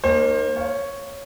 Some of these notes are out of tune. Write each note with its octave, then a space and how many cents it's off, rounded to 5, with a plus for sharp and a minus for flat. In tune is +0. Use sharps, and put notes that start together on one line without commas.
A#3 +0 D#4 -30 C5 +35
C#5 +0 F5 +0